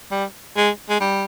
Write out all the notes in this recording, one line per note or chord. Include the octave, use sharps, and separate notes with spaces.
G3
G#3
G#3
G3